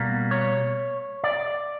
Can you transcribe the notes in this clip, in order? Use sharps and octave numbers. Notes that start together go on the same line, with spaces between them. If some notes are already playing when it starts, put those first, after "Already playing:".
Already playing: B2 G3 A#3
C#5
D5